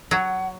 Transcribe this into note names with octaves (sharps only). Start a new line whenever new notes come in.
F#3 F#5